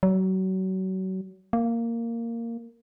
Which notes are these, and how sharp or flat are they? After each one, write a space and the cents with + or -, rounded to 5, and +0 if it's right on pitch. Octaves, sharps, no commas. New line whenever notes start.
F#3 +30
A#3 -10